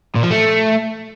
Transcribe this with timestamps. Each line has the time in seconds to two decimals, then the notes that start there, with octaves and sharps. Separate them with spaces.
0.16 A#2
0.23 F3
0.31 A3